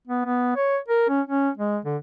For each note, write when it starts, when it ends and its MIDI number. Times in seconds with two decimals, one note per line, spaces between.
0.07 0.24 59
0.25 0.55 59
0.56 0.77 73
0.88 1.08 70
1.09 1.21 61
1.27 1.49 61
1.57 1.79 56
1.85 1.97 50